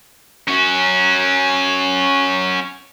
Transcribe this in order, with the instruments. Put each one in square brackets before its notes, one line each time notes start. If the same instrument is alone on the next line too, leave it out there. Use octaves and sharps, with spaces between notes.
[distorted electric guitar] C#4 F#4